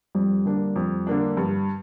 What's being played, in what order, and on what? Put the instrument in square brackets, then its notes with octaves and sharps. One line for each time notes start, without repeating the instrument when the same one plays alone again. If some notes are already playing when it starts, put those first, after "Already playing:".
[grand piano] F2 [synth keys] G3
[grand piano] D3 A#3 D4
F2
D3 A#3 D4
[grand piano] G2 [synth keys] F3